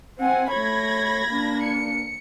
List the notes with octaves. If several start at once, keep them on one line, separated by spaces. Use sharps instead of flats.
C4 F#5 G#5
A3 C#5 B5 G#6 A#6
A#3 D4
C#7